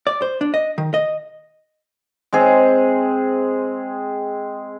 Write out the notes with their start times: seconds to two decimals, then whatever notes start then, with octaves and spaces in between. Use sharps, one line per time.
0.07 D5
0.22 C5
0.41 D4
0.54 D#5
0.78 D#3
0.94 D#5
2.33 G#3 C4 G#4